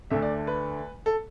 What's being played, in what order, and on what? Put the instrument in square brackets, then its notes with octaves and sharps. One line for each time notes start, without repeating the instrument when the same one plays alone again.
[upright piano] D2 D3 A3 E5
D5
B4
A4